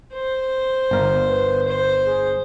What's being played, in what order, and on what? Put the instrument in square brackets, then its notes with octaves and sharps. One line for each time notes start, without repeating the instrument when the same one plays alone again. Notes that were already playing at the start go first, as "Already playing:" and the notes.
[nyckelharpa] C5
[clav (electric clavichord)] G1 A#4
[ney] B4
[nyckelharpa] C5
[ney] G#4